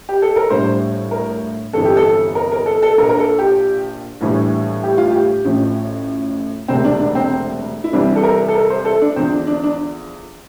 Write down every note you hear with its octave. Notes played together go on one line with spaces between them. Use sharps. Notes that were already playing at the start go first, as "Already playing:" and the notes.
G4
A4
A#4
A#1 A2 G3 C5
A#4
G1 F2 E3 A4
G4
A4
A#4
A#4
A4
A4
A#1 A#2 F3 A#4
A#4
A4
G4
A#1 A2 E3 G3
G4
F4
G4
A1 A2 F3
E1 D2 C3 C4
D4
D4
C4
E4
C2 C3 E3 G3 D4
A4
A#4
A4
A#4
C5
A4
D4
E2 D3 F3 C4
D4
D4
D4